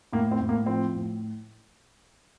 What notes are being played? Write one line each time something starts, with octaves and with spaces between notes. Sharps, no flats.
A2 A#3
C4
A2
A#3
F3 C4
A2